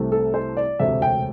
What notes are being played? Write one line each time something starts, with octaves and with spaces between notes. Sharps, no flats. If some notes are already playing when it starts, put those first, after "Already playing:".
Already playing: C2 C3 A3
A4
C5
D5
E1 D2 C3 A3 E5
G5